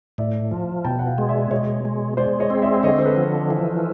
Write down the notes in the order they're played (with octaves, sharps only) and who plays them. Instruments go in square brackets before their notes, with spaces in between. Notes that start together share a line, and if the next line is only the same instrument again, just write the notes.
[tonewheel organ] A2 [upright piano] D5 E5
[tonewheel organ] F3
[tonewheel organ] B2 [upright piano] G5 A5
[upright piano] F#5
F5 G5
[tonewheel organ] G#3
[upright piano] D5 E5
[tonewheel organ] B2 [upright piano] C#5 D#5
[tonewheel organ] G#3
[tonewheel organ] G#3 [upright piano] C5 D5
[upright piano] C#5 D#5
[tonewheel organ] C4
[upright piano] D5 E5
[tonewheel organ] D3 [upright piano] C#5 D#5
[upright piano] C5
A4 B4
[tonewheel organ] F3
E3